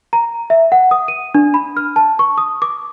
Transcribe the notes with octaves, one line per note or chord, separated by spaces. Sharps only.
A#5
E5
F#5
D#6
D#7
D4
B5
F6
A5
C#6
D#6
D6